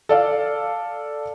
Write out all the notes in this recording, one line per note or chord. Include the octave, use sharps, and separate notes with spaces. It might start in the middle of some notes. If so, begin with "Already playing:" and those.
A4 D5 F5